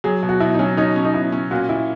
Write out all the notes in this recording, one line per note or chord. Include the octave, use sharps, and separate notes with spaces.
F#3 G#4
B2
F#4
B2 E4
D#4
F#3 C#4
C#4 D#4
C#4
D#4
B2 E4
C#4
A#2 F#4
A#2 E4